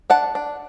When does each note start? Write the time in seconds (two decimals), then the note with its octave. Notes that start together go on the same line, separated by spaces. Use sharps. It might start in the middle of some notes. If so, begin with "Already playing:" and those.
0.10 D4 F#5 A5
0.35 D4